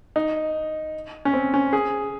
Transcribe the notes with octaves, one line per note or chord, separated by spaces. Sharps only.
D#4
C#4
C4
C#4
G#4